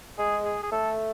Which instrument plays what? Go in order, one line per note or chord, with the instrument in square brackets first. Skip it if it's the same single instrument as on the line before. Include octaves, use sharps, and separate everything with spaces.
[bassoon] G#3 [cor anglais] G#4
[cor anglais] G#4
G#4
[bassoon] A3 [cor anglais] A4